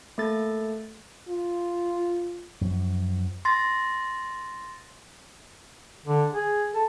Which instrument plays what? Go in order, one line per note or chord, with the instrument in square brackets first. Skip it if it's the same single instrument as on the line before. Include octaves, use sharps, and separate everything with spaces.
[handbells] A3 A#3 A4 A6
[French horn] F4
[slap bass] F#2 F3
[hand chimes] C6 A6 A#6
[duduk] D3
G#4
A4